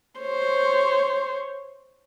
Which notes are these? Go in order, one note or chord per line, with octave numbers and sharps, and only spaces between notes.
C5 C#5